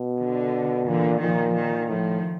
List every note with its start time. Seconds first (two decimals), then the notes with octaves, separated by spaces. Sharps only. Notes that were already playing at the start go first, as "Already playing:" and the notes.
Already playing: B2
0.18 D3
0.87 A#2 D3 E3
1.21 A#2 D#3 F3
1.55 D#3
1.89 A2 D#3 F3